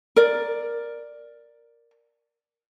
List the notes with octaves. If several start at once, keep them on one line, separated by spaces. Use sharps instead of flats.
A#4 D5